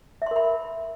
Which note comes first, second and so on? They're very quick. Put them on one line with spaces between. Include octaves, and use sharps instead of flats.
E5 C6 A#4 B5